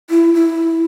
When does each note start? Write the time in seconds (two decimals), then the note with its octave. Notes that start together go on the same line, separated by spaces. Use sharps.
0.10 E4
0.34 E4